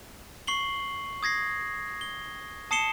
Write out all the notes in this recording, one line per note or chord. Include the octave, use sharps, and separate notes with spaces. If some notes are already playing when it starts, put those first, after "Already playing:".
C#6 C7 F#7 G7
D#6 G#6 A#6 C7
G7
A5 D#6 C7 C#7 E7 G7